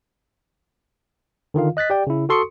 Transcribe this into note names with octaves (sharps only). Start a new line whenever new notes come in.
D3 D#3 F4 F5
D#5 F#6 A6 B6
G4 D5 G5
C#3 E4
F#4 A4 C6 C#6 D#6 C#7